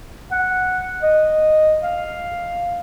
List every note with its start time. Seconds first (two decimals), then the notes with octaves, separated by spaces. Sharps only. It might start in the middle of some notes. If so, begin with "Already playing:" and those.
0.32 F#5
1.03 D#5
1.83 F5